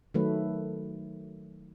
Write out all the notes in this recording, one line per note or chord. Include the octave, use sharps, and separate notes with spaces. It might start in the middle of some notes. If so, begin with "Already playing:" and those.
D#3 F#3 A3 B4